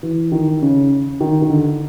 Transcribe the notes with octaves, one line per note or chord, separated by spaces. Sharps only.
E3
D#3
C#3
D#3
D#3
D3